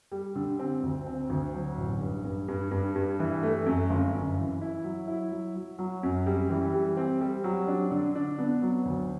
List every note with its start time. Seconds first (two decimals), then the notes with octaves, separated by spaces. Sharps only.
0.12 G3
0.35 D3
0.59 C4
0.83 D2
1.06 C4
1.30 D2
1.54 F#3
1.77 A1
2.01 G2
2.25 G2
2.48 G2
2.71 G2
2.96 G2
3.20 E3
3.43 A3
3.66 F#2
3.90 G1
4.14 F#2
4.37 E3
4.61 E4
4.84 F#3
5.08 E4
5.32 F#3
5.55 F#3
5.79 F#3
6.03 F#2
6.26 G3
6.50 E3
6.74 G3
6.97 C4
7.21 G3
7.44 F#3
7.68 D4
7.91 D3
8.16 D4
8.39 B3
8.62 F#3
8.85 D2